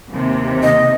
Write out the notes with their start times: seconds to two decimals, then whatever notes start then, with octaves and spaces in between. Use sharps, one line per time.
0.12 D#2 C3
0.63 D#5